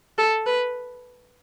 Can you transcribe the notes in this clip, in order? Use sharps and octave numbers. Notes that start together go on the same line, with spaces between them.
A4
B4